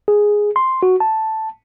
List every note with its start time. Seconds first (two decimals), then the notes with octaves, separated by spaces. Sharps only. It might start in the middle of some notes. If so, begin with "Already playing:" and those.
0.08 G#4
0.56 C6
0.83 F#4
1.00 A5